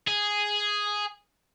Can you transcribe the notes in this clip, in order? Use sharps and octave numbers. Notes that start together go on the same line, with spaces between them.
G#4